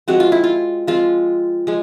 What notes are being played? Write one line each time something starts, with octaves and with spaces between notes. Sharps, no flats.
F3 G#3 C4 F#4
F4
E4
F4
F3 G#3 C4 F4
F3 G#3